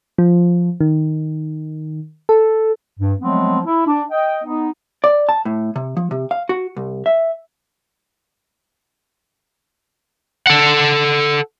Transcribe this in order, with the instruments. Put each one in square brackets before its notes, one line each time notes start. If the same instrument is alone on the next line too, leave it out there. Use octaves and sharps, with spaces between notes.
[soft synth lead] F3
D#3
A4
[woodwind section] G2
F3 F#3 G#3 A3 B3 C4
E4
D4
D#5 G5
B3 D#4
[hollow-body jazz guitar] D5
A5
A2
C3
F3
C3
F5
F#4
C2
E5
[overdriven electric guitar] A4 F#5